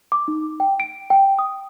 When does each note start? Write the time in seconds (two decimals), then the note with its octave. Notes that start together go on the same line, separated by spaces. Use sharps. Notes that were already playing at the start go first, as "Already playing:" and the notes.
0.12 D6
0.28 D#4
0.60 G5
0.80 D7
1.10 G5
1.39 D#6